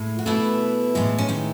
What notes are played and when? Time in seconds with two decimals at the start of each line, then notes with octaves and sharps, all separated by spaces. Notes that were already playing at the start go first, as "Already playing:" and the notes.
Already playing: A2 G#3
0.19 F#4
0.26 B2 E3 A3 E4
0.95 A2 E3 G#3
1.18 C#4
1.29 D#3 D#4